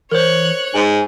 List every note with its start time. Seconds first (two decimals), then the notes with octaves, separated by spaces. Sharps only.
0.11 E3 A#4 C5 C#5 F#6
0.74 G#2 G#5